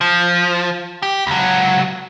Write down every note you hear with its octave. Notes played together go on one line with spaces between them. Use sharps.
F3
G4
C#2 F#3